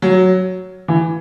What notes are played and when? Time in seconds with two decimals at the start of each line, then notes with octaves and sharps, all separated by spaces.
0.02 F#3
0.88 E3